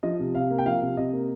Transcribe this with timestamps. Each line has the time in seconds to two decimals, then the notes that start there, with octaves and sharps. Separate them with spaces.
0.03 F3 D#5
0.19 C3
0.35 C3 F5
0.50 A#3
0.58 G5
0.66 F3 F5
0.82 C3
0.97 C3 D#5
1.13 A#3